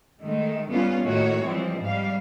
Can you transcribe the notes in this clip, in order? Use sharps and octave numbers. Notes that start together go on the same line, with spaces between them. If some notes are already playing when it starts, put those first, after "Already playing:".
D#3 G#3 A3
G3 A#3 B3 C#4 F4
A2 D#3 A3 A#3 F#4 C#5
E3 F3 G3 G#3 C4
G#2 G3 F5